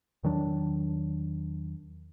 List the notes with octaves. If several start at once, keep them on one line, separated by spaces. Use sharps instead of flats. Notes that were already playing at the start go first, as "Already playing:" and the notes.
E2 D#3 F#3 D4